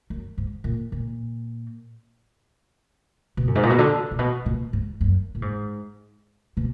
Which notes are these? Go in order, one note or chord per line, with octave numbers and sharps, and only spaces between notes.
F#2
G#2
A#2
A#2
B2
F#2
G#2
A#2
B2
D3
A#2
B2
A#2
G#2
F#2
A#2
G#2
B2